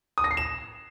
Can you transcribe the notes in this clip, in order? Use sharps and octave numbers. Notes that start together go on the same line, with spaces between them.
D#6
A#6
C7
E7